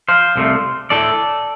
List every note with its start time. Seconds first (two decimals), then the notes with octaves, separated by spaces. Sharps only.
0.08 C5 F5
0.36 C2 C3 A3
0.90 A2 A3 A4 D5